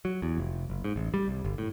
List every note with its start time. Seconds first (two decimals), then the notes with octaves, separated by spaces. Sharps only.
0.05 F#3
0.22 E2
0.38 F1
0.70 F#1
0.84 G#2
0.96 A1
1.14 G3
1.28 C2
1.45 G1
1.58 A2